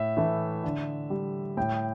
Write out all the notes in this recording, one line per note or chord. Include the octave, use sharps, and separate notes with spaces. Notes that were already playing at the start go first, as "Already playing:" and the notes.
Already playing: A2 E5
E3 A3
D3
G3
A2 G5